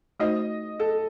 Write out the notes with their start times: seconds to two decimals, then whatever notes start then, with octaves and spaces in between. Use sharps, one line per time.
0.20 A3 D#4 F#4 C5 D#5
0.80 A4